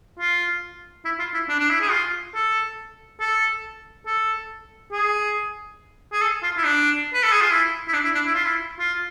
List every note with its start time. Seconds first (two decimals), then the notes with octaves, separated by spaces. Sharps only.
0.19 F4
1.05 E4
1.19 F4
1.34 E4
1.49 D4
1.59 D4
1.70 E4
1.81 G#4
1.91 F4
2.34 A4
3.20 A4
4.06 A4
4.92 G#4
6.13 G#4
6.22 A4
6.43 F4
6.57 E4
6.64 D4
7.14 B4
7.23 A4
7.32 G#4
7.42 F4
7.51 E4
7.88 E4
7.94 D4
8.05 E4
8.15 D4
8.26 E4
8.35 F4
8.45 E4
8.80 F4